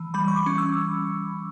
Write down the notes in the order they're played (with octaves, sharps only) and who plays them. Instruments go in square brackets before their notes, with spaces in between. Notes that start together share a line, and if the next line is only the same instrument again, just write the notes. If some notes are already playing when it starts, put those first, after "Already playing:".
Already playing: [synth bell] E3
G3 B5
C#6
D6
C#4
E6